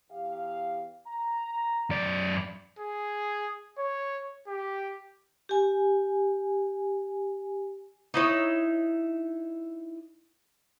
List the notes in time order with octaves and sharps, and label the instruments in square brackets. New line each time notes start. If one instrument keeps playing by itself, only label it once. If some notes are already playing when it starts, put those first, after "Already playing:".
[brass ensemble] E2 G4 F5
A#5
[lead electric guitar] F#2 D5
[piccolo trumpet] G#4
C#5
G4
[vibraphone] G4 G#5
[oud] D#4 E4 C#5